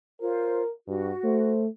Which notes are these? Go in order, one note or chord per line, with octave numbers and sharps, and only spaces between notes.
F4 A#4 C5 C#5
G2 F#4
A3 C5